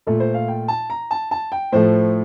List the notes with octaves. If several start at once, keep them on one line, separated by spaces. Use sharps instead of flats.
A#2 A3 A4
C5
F5
G5
A5
A#5
A5
A5
G5
A2 F3 A3 C5